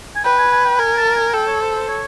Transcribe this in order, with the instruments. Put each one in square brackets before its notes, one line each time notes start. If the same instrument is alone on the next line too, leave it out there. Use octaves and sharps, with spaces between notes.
[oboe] G#5
[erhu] B4 [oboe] G5
[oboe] G#5
G#5
G5
[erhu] A#4 [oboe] G#5
[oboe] A5
G#5
[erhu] A4 [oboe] G5
[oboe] C#5
C5
C5
C#5